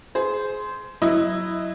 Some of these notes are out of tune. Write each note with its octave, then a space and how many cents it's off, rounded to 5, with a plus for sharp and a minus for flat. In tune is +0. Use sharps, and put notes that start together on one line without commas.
G#4 +20 C5 -10
F#3 +0 E4 +0 D#5 +0